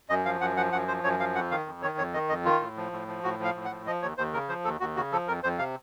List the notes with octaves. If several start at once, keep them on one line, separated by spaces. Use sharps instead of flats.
F#2 D#5
F3 F5
F#2 F#5
F3 F#5
F#2 F#5
F3 C5
F#2 C#5
F3 F5
F2 F#5
D#3 F5
F2
D#3 C#5
F2 C#5
D#3 D#5
F2 D#5
D#3 F4
A2
F3
A2
F3
A2 F#4
F3 F5
A2
F#5
F3
F3 D#5
D#2 C#5
D#2 C5
C#3 A#4
F3 C5
D#2 A4
D#2 F#4
C#3 F#4
F3 A4
F2 A#4
F2 C5
C3 F5